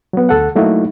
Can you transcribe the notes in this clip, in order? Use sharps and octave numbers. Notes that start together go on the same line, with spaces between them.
F#3 B3
D2 A4 F#5
F#3 A3 A#3 D#4 E4 F#4